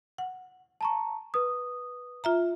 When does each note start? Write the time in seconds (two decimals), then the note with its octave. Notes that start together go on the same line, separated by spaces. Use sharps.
0.18 F#5
0.81 A5 A#5 C#6
1.34 B4 D#6
2.24 F4 E5 A#5